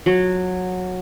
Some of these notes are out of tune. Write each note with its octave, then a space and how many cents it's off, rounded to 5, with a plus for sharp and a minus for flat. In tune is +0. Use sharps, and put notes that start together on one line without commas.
F#3 -15